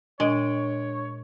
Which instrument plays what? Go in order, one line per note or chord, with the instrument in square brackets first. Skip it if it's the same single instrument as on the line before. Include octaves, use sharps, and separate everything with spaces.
[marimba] A#2 [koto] G#3 [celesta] D4 D7 [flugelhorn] C#5